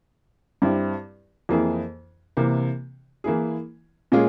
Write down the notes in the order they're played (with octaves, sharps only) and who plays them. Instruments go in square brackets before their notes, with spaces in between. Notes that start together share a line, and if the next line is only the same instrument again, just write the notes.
[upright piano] G2 G3 C4 E4 G4
F2 E3 A#3 E4 G#4
C3 E3 A#3
E3 A#3 E4 G#4
A#2 G#3 C#4 F4 G#4